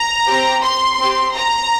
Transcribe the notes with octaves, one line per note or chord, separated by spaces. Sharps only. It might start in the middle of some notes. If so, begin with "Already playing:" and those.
Already playing: A#5
C4 G4
C6
C4 G4
A#5